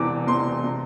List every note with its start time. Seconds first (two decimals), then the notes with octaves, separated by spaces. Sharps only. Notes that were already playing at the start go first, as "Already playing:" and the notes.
Already playing: E1 E2 C3 E3 D6
0.27 E1 E2 C3 E3 C6
0.64 C3